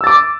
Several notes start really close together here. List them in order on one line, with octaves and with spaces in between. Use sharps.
E6 A6 D6